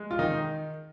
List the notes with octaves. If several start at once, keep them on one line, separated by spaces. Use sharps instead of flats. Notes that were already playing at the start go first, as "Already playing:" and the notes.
Already playing: G#3
F4
D#3 D#4